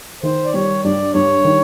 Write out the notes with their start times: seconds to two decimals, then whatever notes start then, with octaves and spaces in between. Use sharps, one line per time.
0.23 D#3 C5
0.45 D5
0.54 G3 C#5
0.84 G2 D5
1.14 G2 C#5
1.44 D#3